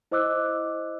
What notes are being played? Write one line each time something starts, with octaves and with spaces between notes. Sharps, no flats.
E4 C5 D#5 D6 E6 F#6